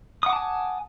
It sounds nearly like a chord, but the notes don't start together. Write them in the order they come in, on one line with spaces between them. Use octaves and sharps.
D#6 F#5 D6 A5 G#5